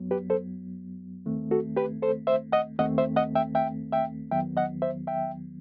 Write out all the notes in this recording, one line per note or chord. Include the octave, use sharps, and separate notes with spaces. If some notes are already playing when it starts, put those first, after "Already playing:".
Already playing: F#2 F#3 B3
G4 B4
A4 C5
D#2 D#3 A3 C4
F#4 A4
G4 B4
A4 C5
C5 E5
D#5 F#5
D#2 D#3 A3 C4 D#5 F#5
C5 E5
D#5 F#5
E5 G5
E5 G5
E5 G5
E2 D#3 F#3 B3 E5 G5
D#5 F#5
C5 E5
E5 G5